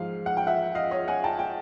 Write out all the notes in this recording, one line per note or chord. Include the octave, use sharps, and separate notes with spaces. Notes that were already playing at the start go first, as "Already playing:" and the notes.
Already playing: G#2 F3 G#3 F5
F#5
G5
E5 F#5
D#5 F5
C#5 D#5
F#5 G#5
G5 A5
G5